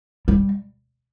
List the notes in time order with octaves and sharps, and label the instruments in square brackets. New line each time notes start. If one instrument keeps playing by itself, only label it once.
[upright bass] G3